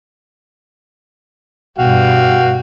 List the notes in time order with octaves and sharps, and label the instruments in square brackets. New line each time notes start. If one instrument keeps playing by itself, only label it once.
[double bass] G2 B2 [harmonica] F#4 F5 G5